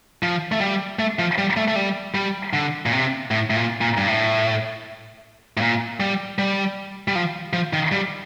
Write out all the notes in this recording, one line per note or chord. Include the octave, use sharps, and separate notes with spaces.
F3
A3
G3
A3
F3
G3
A3
A3
G3
G3
D3
A#2
C3
A2
A2
A#2
A#2
G2
A2
A2
A#2
G3
G3
G3
F3
F3
D#3
G3